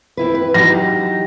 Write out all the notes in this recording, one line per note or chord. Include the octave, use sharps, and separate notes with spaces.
C4 E4 B4
B4
F#3 D#4 G4 A#6